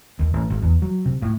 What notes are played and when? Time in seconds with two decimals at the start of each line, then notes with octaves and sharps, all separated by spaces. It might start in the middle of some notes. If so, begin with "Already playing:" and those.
0.19 D#2
0.34 A1
0.50 G#1
0.62 E2
0.82 F#3
1.06 C3
1.22 A2